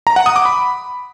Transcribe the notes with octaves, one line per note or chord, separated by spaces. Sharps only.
A#5
F#5
D#6
D6
B5